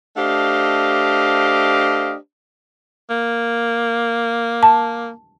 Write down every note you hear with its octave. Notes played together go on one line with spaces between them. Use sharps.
A3 D4 G4 C5 D#5 F5
A#3
A5